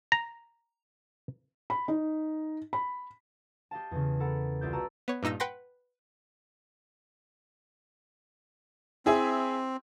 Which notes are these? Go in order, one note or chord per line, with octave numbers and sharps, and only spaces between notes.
A#5
B5
D#4
B5
G4 D#5 F5 A5
E2 C#3
A4 A#4 F#5 B5
C2 F4 G#4 D5 E5 G6
F#4 B4 A5 A#5 E6
B3 C#5
G2 A#2 D#4 E6 A#6
B4 F#5 G5 C6 A#6
C4 E4 G#4 E5